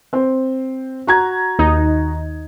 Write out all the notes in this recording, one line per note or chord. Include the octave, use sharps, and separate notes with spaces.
C4 C5
F#4 A#5 G#6
D#2 D#4